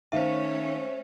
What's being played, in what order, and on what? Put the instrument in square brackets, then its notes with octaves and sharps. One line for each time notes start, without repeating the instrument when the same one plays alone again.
[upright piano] D#3 D#4 F5 [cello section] A3 C#4 C#5 [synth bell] C5 E5